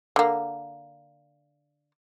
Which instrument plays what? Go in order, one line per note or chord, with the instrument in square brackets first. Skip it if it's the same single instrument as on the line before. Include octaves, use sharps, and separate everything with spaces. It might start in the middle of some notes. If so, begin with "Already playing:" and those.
[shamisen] D3 A#3